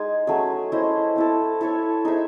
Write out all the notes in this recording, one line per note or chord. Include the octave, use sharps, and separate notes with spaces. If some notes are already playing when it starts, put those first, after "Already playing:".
Already playing: G#3 D#4 G#4
F#3 A3 C#4 G#4
C#4 E4 C5 D#5
C4 E4 A4
E4 A4 C#5 E5
D#4 G#4 C5 E5